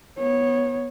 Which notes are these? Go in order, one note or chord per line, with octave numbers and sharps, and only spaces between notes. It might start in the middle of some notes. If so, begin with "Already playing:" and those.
B3 C#5